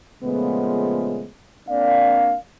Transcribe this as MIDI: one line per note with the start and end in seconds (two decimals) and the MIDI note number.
0.23 1.27 46
0.23 1.27 49
0.23 1.27 53
0.23 1.27 56
0.23 1.27 57
0.23 1.27 59
1.69 2.35 58
1.69 2.35 60
1.69 2.35 62
1.69 2.35 74
1.69 2.35 77